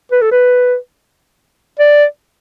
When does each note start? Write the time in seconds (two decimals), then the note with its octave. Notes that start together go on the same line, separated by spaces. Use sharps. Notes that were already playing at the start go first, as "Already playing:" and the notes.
0.12 B4
0.22 A4
0.32 B4
1.79 D5